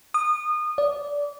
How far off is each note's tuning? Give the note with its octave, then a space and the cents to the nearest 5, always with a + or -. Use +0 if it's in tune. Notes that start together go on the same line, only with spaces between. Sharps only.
D#6 -25
D5 -20